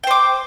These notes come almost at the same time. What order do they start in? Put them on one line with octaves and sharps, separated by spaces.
G5 C5 D6